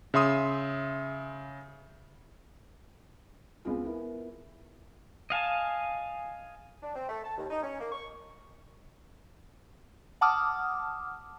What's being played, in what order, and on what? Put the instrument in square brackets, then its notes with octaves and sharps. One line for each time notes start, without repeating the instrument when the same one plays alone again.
[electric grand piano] C#3 E5 C6 D#6
[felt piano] C#2 B3 C4 F4 G#4
B3 E4 A#4
[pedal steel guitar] D#5 F5 G#5 A5
[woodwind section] D4
C4
A3
A5
D#2
D#4
C#4
A#3
C#6
[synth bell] F#5 A5 D6 D#6 F6